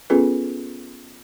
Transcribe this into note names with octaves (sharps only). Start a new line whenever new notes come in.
B3 C#4 F4 G#4 A4 B4